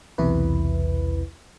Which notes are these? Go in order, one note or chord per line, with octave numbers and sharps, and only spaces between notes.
B1 E2 C3 E4 B4